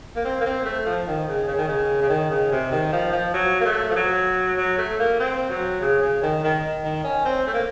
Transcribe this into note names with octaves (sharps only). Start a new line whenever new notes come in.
A#3
C4
A#3
C4
A3
F3
D#3
C#3
C#3
D#3
C#3
C#3
D#3
C#3
C3
D#3
F3
F3
F#3
A#3
A3
F3
F#3
F#3
A3
A#3
C4
F#3
C#3
C#3
D#3
D#3
D#3
C#4
C4
A3
A#3